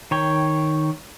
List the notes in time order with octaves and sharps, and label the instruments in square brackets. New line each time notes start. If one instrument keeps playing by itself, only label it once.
[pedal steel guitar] D#3 C#5 G5